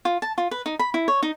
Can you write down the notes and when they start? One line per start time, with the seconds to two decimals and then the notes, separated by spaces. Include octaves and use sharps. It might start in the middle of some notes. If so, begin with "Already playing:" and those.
0.05 F4
0.22 A5
0.38 F4
0.51 B4
0.66 D#4
0.79 B5
0.94 E4
1.08 C#5
1.23 D#4